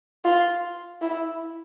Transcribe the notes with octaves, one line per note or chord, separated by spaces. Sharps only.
F4
E4